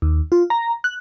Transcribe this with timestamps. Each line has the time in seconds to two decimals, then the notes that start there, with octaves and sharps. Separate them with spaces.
0.02 D#2
0.32 F4
0.50 A#5
0.84 F#6